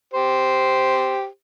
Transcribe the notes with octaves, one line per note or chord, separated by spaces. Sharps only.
G4 C5